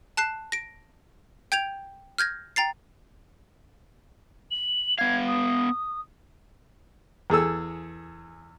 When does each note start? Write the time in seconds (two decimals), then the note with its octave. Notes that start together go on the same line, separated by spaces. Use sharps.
0.17 A5 F#6 C7 E7
0.52 A#6 D7
1.52 G5 G6 G#6 D7 F7
2.18 F6 G6 G#6 A#6
2.56 G5 A#5 A6 C7
4.51 F#7
4.99 B3 F5 G#6
5.27 D#6
7.30 E2 G#4 A4 E6